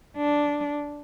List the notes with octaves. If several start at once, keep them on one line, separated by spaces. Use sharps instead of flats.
D4